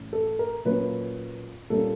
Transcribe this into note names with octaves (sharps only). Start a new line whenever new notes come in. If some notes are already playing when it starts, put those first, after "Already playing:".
Already playing: A2 E3 C#4
A4
A#4
A#2 F#3 A#3 C#4 B4
A#2 G3 A#3 C#4 A4